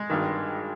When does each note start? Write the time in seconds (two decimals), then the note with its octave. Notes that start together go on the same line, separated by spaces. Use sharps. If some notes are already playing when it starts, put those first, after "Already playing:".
Already playing: G#3
0.10 G#1 G2 D#3